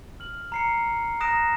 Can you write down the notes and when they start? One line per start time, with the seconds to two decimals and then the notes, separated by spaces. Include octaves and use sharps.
0.20 F6 F#7
0.52 A#5 C7 C#7
1.20 A#5 D#6 F#6 A#6 D7 E7